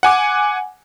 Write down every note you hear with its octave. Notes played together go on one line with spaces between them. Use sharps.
F#5 G#5 D6